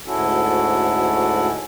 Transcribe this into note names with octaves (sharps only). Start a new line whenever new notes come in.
D2 G#2 C#4 E4 F#4 A4